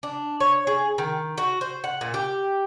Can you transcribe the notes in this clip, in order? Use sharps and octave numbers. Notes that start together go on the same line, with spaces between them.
D4
C#5
G#4
D#3
F#4
C5
F#5
A#2
G4